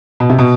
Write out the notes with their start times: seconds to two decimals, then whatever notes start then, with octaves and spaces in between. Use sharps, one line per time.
0.20 B2
0.30 C3
0.39 B2